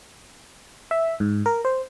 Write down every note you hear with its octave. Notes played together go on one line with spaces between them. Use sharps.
E5
G#2
A#4
C5